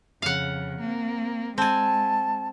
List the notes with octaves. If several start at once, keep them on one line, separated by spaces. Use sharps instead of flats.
F2 C#3 F5 F#5
A#3 C4
G#3 C4 G#5 A5